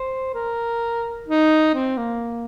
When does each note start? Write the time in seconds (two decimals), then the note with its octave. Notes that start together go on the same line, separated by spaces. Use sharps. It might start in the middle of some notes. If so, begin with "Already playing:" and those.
Already playing: C5
0.34 A#4
1.28 D#4
1.74 C4
1.97 A#3